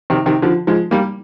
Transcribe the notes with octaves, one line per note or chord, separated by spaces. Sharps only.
C3 D#3
C3 D#3
D3 F3
F3 G#3
G3 A#3